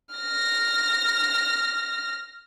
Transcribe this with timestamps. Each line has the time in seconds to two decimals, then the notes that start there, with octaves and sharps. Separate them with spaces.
0.14 F6 A#6